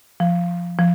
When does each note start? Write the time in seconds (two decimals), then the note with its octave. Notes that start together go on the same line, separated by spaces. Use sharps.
0.20 F3
0.79 F3